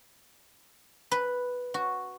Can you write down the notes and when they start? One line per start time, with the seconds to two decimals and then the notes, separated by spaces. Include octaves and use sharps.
1.11 B4
1.74 F#4